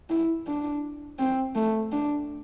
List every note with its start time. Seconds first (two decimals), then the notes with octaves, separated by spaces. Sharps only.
0.10 E4
0.47 D4
1.19 C4
1.55 A3
1.92 D4